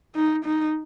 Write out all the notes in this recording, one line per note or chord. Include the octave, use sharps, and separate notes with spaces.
D#4
D#4